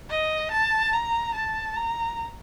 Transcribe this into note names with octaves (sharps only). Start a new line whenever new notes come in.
D#5
A5
A#5
A5
A#5